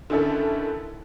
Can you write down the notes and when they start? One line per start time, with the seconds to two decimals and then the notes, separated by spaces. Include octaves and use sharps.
0.10 D3 D#3 C#4 E4 A4